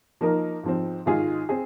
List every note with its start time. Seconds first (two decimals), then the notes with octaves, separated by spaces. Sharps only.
0.21 F3 A#3 D#4 A#4
0.63 G#2 F3 C4
1.06 G#2 D#3 G#3 F4 G#4
1.49 C4 G#4